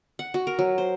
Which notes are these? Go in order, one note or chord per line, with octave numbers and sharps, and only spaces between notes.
F#5
F#4
A#4
F#3
C5